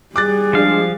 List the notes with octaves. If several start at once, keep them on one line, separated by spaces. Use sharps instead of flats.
G3 G#4 D6 F#6 A6
F3 G#3 D4 F5